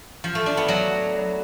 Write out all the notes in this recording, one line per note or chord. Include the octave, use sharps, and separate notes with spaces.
F3
A3
D4
B3
F#3